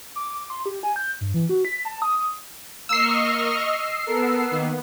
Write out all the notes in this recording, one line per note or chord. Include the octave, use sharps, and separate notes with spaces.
D6
C6
G4
G#5
G6
G2
E3
F#4
B6
A5
D#6
A#3 D#5 C#6 E6 F6 C7
D#5
B3 A4 A#4
D#3 A#3